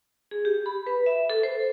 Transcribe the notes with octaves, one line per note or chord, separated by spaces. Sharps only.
G#4
G4
B5
B4
E5
A4
C5